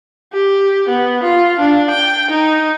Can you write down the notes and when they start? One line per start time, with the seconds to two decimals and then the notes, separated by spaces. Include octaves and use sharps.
0.33 G4
0.88 B3
1.23 F4
1.59 D4
1.90 G5
2.30 D#4